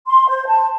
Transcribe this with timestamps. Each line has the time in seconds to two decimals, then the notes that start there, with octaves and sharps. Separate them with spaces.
0.07 C6
0.28 C5
0.48 A5